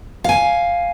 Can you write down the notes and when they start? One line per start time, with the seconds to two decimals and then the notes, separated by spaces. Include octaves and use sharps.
0.24 F5 G#5